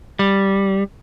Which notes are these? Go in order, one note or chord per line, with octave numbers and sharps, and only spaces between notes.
G3